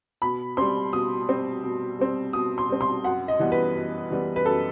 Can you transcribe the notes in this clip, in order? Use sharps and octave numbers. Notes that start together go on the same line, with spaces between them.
B2 B5
G3 C4 C6
B2 D#6
G3 C4
B2
G3 C4
B2 D#6
C6
G3 C4
C6
F#2 F#5
D#5
E3 G3 B3
B4
F#2
E3 G3 B3
B4
F#2 A4